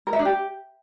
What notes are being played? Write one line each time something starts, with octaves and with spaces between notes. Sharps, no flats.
A#4
E5
D4
G4